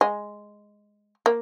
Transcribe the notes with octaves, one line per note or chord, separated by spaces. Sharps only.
G#3
A#3